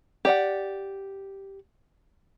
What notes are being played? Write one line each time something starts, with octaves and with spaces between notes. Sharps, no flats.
G4 D5 F#5